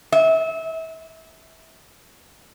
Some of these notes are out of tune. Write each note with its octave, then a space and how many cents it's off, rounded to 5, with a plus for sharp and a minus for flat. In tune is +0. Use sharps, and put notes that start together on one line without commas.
E5 -30